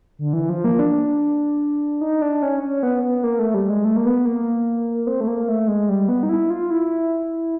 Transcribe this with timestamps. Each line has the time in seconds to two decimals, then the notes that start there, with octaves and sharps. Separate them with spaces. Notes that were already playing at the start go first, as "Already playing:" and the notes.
0.19 D3
0.33 E3
0.49 F3
0.64 A#3
0.79 D4
2.01 D#4
2.22 D4
2.42 C#4
2.63 C#4
2.83 B3
3.03 B3
3.24 A#3
3.39 A3
3.54 G3
3.69 G#3
3.85 A3
3.96 A#3
4.06 B3
4.25 A#3
5.07 C4
5.21 A3
5.27 A#3
5.48 A3
5.68 G#3
5.89 G3
6.09 B3
6.23 D#4
6.29 E4
6.50 F4
6.70 E4